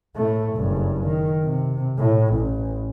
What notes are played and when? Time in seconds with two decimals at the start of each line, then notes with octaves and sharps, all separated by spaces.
0.16 A2 A3
0.53 F#1 G2
1.04 D#3
1.44 C3
1.99 A2
2.34 A1